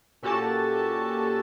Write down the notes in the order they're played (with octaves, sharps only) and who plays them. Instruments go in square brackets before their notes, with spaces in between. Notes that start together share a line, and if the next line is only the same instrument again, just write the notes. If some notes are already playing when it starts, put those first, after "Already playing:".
[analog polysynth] A#2 C#4 F#4 G4 A4 A5